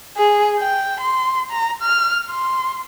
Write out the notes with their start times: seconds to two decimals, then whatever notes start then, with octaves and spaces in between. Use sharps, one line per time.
0.18 G#4
0.60 G5
1.00 C6
1.51 A#5
1.82 F6
2.30 C6